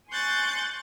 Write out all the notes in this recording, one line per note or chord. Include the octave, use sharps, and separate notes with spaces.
G#5 C6 C#6 F#6 G6 A6